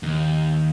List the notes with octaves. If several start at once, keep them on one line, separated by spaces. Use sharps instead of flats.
D#2